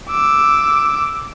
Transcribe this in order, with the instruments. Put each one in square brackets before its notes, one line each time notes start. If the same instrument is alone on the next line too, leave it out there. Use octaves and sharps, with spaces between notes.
[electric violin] D6 E6